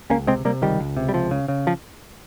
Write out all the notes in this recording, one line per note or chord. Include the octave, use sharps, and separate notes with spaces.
C#2 A#3 C#4
C3 G#3 C4
C3 G3 A#3
C#2 D#3 G3
C#2
C3
G3
C#2 F3
C#3
C#3
F3